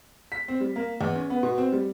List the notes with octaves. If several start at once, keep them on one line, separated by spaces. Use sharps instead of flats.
B6
C4
G3
A#3
E2
C#4
B3
B2
C4
G3